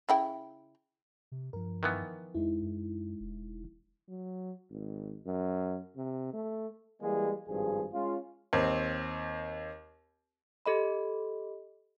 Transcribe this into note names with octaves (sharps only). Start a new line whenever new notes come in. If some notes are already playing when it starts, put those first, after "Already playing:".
C#3 E4 G5
C3
G2 F3 A#4
D#3 E3 B3
F2 G#3 D#4 E4
F#2
E1
F#3
G#1
F#2
C3
A3
E3 G3 G#3 A#3 G#4
G#1 G2 F3 G#4
G#3 C#4 F4
D#2 C4
G4 A4 D#5 B5